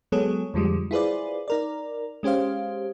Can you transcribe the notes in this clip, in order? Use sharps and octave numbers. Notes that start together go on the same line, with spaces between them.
F#3 G#3 B3 G#4 A4 C#5
F2 D3 F3 G3 G#3
E4 F4 G#4 B4 C5 D5
D#4 A#4 D5
G#3 C#4 G4 C5 F5